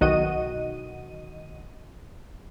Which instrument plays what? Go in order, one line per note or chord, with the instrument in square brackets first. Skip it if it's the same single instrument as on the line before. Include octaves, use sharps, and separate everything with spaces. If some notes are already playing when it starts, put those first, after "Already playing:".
[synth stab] B1 D#3 F#4 D#5 D#7